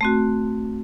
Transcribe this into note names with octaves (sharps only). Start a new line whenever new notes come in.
A3 C4 F#4